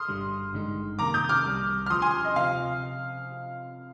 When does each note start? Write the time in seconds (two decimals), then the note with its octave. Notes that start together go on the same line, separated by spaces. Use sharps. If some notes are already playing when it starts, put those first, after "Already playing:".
Already playing: C6 D#6 F6
0.08 G1 G2 D3 G3
0.53 G#1 G2 D3 G#3 D#4
0.99 F2 C3 D#3 A#3 A#5 D6
1.14 D#6 G6
1.29 D6 F6
1.45 C2 C3 G3
1.86 F6
1.90 D2 D3 F3 C6 D#6
2.02 G#5 C6
2.25 D#5
2.36 C3 F3 C4 F5